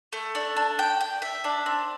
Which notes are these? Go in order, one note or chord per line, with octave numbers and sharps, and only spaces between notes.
A3
D4
D4
G5
G5
E5
D4
C4